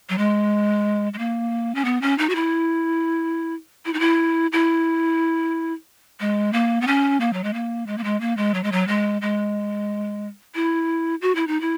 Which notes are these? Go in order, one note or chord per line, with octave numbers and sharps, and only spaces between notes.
F#3
G#3
G#3
A#3
C#4
B3
C#4
D#4
F#4
E4
E4
D#4
E4
E4
G#3
A#3
B3
C#4
A#3
F#3
G#3
A#3
G#3
A#3
G#3
A#3
G#3
F#3
G#3
F#3
G#3
G#3
E4
F#4
E4
D#4
E4